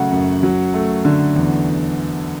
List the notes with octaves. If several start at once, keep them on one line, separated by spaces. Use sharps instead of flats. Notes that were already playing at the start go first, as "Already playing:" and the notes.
Already playing: C#3 F#3 A3 F#5
F#2
F#3
A3
D3
E2